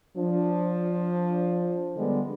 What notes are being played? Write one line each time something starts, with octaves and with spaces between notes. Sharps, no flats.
F3 D4
D3 G3 G#3 B3